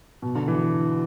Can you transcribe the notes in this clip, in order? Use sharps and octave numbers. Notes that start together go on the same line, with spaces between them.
B2
D3
E3